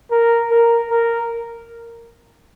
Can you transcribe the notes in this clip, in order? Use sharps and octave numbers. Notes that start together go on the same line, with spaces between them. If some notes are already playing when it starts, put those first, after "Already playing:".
A#4
A#4
A#4